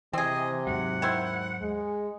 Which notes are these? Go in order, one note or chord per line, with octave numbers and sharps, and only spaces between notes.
C3 E3 C4 G#4 D#5
D#2 G#2 F#3 F#5
D#3 E4 C5
G#3